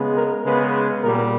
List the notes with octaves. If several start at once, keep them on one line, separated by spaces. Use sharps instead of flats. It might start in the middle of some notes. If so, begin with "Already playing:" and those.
Already playing: C#3 G#3 B3
A#4
C#3 G#3 B3 B4
A#2 G3 B3 A#4